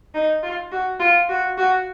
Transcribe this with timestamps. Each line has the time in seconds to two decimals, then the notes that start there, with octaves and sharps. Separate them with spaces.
0.14 D#4
0.43 F4
0.72 F#4
1.00 F4
1.29 F#4
1.58 F#4